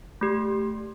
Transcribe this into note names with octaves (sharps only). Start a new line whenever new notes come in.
A3 G4